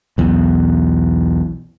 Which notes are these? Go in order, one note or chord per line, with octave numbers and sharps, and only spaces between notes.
B1 E2